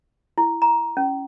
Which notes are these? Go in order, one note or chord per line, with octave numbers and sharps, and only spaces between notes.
E4
A#5
C#4